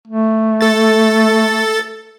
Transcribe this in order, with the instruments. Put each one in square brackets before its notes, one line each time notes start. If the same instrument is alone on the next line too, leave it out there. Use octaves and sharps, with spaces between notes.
[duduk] A3
[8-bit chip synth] A4 A6